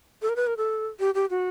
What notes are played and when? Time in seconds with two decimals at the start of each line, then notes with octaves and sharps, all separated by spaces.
0.22 A4
0.29 A#4
0.36 B4
0.47 A#4
0.57 A4
1.00 G4
1.15 G4
1.30 F#4